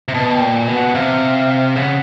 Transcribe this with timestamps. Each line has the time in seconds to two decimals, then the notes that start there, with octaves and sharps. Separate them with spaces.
0.08 C3
0.13 B2 A5
0.33 G5
0.41 A#2
0.68 B2
0.75 F#5
0.95 C3 F5
1.76 C#3 F#5